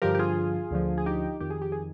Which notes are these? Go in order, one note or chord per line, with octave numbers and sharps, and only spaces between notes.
G2 D3 F3 G4 A#4
G4
F4 G#4
D2 D3 F3
G#4
D#4 G4
F2 D#3 G4
G#4
G4
G#4